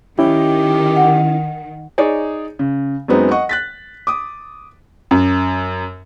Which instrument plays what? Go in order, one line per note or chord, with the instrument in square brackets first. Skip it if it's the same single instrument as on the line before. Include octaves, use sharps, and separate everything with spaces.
[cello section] D#3 [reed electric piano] C#4 E4 [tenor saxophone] G4
[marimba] F#5
[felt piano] D#4 G#4 C#5 D5
C#3
F#2 F#3 G#3 B3 C4 D#4
D#5 F#5 C#6
F#6 A6 B6
D6 D#6
[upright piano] F#2